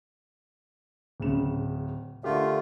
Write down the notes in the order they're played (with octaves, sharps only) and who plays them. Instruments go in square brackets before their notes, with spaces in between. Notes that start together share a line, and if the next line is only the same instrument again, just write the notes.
[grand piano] D1 C#3 E7
[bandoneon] D3 A3 F4 [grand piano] G4 A#4